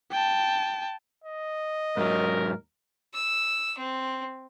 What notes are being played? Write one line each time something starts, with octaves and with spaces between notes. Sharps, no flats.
G5 A5
D#5
D#2 G#2 F#3 A#4
E6
C4